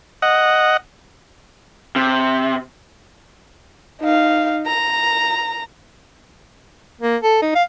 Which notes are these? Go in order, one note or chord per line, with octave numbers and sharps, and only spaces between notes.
D#5 F#5
C3
D#4 F5
A#5
A#3
A4
D#4
F5